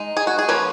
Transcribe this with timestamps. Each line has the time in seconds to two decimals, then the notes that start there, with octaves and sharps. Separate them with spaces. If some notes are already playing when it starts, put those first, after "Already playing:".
Already playing: G#3 D#4
0.17 G#4
0.27 F#4
0.39 G#4
0.48 F3 A#3 C#4 B4